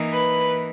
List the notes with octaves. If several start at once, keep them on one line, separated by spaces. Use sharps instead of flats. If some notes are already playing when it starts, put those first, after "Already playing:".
Already playing: E3 A#3 D#4
B4